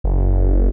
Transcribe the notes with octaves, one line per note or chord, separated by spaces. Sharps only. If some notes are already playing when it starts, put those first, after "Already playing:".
F#1